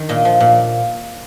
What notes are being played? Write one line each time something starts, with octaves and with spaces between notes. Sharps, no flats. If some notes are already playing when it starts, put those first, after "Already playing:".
Already playing: D#3
A#2 D#5
F3
A#2